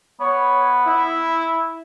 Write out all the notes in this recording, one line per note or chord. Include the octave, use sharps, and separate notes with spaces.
B3 C#5
E4